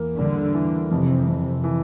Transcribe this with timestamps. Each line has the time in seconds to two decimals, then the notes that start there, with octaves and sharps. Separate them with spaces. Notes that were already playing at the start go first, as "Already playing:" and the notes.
Already playing: E2 A#3
0.18 D3 G3
0.54 E3
0.90 F2 C3
1.27 F2
1.64 E3